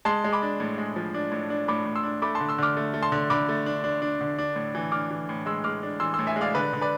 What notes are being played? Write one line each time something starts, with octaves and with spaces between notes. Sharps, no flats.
G#3 A5 C6
G#3
B5 D6
D4
A2
G#3
F3
D4
A2
D4
A2 B5 D6
A2
C6 E6
D4
A3 B5 D6
A5 C6
D3
C6 E6
D3 D6 F6
A3
A3
A5 C6
D3
D3 B5 D6
A3
D4
D4
D4
D3
D4
A2
E3
D4 D6 F6
E3
A2
G#3 C6 E6
G#3 D6 F6
D4
E3 C6 E6
A2 C6 E6
E5 G#5
G#3
D5 F5
D3 B4 D5
D3
B4 D5